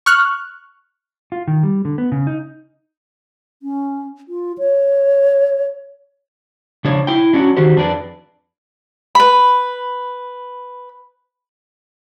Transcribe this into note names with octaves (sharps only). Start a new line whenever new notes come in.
C#6 F6 F#6
F4
D#3
G3
D3
B3
C#3
D#4
C#4
F4
C#5
C#3 F3 D4 C#5
E4 G5
F#3 C#4 D4 F#4
D#3 F#4 G4 C5
F2 D4 G#4 B4 D5
B4 B5